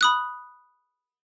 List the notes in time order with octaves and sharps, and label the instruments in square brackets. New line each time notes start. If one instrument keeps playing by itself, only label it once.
[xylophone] B5 D#6 F#6